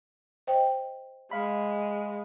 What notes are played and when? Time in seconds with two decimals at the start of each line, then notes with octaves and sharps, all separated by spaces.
0.47 C5 D#5 G5
1.31 G#3 F5 B5